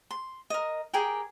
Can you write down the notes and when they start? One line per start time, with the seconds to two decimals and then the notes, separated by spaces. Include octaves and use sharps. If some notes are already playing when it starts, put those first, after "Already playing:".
0.11 C6
0.50 A#4 D#5
0.93 G4 G#4 A#4 G5